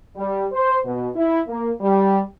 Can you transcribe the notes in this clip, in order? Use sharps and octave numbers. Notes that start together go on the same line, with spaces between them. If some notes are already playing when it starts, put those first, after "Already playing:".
G3
C5
B2
E4
A#3
G3